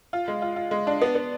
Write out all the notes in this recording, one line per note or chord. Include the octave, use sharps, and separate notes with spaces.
F4
G#3
F4
F4
G#3
D4
B3
B3